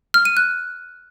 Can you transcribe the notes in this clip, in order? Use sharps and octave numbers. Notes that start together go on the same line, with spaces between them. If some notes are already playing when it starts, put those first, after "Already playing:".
F6
D#7
F#6